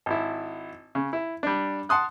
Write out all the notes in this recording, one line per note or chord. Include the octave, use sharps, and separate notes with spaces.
G#1 E4
C#3
E4
G3 D4
F#5 A5 C6 D#6 F#6